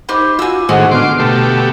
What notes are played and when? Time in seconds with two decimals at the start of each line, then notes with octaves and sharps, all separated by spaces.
0.09 D#4 G4 C5 B5
0.39 F4 F#4 G#5 E6
0.69 A2 D#3 G#3 F#4 C5 D#5 F#5
0.91 D3 B3 C6 D6 F6
1.19 B2 A3 G4